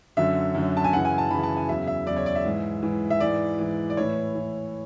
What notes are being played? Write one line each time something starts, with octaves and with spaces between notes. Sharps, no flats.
F#2 D3 F#3 E5
F#2 D3 F#3
A5
G#5
F#2 C#3 E3 F#5
G#5
A5
F#2 C#3 E3 B5
A5
G#5
E2 C#3 F#3 E5
E5
E2 C#3 F#3 D5
C#5
D5
E5
G#2 E3
G#2 E3
E5
G#2 E3 D5
G#2 E3
D5
A2 E3 C#5
A2 E3